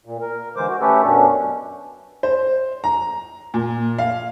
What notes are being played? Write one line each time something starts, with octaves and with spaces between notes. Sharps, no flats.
A#2
A#4
D3 E3 G#3 C5 D6
F#4
A3 C#4 G4 A4 B4
F#2 B2 C#4 D4
C5
A#5
A#2
F5